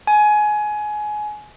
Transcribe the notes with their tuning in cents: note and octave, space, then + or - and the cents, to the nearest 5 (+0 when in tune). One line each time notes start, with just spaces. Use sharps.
G#5 +20